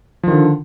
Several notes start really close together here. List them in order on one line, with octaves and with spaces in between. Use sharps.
F3 D#3 D3